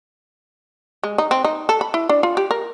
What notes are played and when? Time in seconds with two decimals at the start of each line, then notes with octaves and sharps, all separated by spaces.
1.03 G#3
1.18 D#4
1.31 C4
1.44 D#4
1.69 A4
1.81 B5
1.94 E4
2.09 D4
2.23 F4
2.37 G4
2.51 A#4